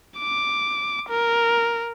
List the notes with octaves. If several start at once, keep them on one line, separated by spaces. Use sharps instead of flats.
D6
A#4